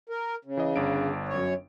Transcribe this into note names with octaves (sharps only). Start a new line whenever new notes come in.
A#4
C#3
E3 D#5
G1 D4 D7
F#2 C#5